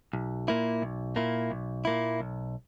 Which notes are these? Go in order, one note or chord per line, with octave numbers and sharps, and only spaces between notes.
B1
A#2 A#3 E4
B1
A#2 A#3 E4
B1
A#2 A#3 E4
B1